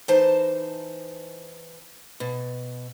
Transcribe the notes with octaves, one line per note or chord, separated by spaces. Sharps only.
E3 D#4 C5 A5
B2